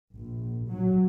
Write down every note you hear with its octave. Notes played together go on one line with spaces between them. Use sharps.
A#1
F#3